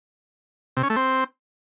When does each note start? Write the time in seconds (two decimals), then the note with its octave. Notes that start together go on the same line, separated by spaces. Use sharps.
0.77 C3
0.83 C#4
0.90 A3
0.96 C4